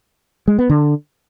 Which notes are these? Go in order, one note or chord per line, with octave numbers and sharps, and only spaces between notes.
G#3
B3
D3